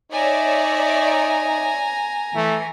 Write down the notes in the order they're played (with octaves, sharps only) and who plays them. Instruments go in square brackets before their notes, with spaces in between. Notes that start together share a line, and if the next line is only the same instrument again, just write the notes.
[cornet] D#4 [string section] C#5 D5 E5 [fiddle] G#5 A#5
[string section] E3 [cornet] A3